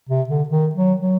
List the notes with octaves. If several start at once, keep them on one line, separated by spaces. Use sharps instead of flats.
C3
D3
D#3
F#3
F#3